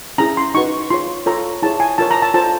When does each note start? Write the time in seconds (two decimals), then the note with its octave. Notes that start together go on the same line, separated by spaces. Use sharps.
0.18 C#4 E4 G#4 A#5
0.37 C6
0.54 D#4 F#4 B4 C#6
0.90 F4 G#4 C#5 C6
1.26 F4 A4 C#5 A#5
1.62 E4 G#4 C#5 A5
1.80 G#5
1.98 F4 A#4 C#5 A5
2.11 A#5
2.22 A5
2.34 F4 A4 C5 A5